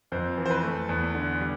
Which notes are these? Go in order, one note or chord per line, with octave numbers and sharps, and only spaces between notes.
F2 C5
E3
C5
B4
A3
E2
D3
G3